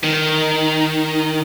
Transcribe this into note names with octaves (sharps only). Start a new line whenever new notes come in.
D#3